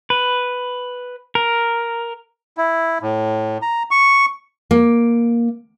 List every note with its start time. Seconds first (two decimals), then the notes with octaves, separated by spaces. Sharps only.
0.10 B4
1.35 A#4
2.58 E4
3.02 A2
3.62 A#5
3.91 C#6
4.71 A#3